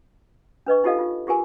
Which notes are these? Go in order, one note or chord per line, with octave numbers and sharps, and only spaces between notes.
D4 B4 D#5 C#6
D#4 F4 G4 A4 D#5 F5
F4
F4 G4 G#4 A#4 G#5